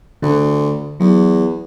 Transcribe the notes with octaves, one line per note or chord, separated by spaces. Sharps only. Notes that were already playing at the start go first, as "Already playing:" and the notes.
D2 D3
E2 F#3